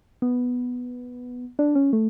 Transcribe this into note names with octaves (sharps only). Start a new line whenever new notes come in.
B3
D4
C#4
A3